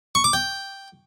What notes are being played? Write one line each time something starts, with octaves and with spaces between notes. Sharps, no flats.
C#6
D6
G5